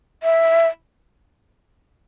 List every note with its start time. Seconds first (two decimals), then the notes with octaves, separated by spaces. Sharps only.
0.23 E5